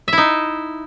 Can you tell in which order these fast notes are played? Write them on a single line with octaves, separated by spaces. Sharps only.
E5 E4 D#4